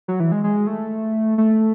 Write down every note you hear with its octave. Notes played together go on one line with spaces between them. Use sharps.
F#3
E3
G#3
G#3
A3
A3